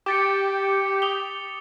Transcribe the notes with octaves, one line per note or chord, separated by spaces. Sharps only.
G4 D6 A6 C#7
D#6 F7 G7